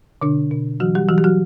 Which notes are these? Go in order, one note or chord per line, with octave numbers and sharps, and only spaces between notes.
B2 D3 D4
B2
E3 F#3 F#4
G3 G4
E3 F#3 F#4
G4
F#3 F#4